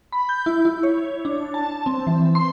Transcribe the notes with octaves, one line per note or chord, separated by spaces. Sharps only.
B5
G6
E4
E4
C#5
D4
A5
C4
E3
C6